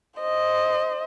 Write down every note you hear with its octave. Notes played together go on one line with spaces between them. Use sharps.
C5 D#5